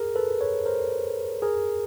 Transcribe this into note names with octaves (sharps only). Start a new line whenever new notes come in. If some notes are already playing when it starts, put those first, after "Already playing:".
Already playing: G#4 A#4
A4 B4
B4 C#5
A#4 C5
G#4 A#4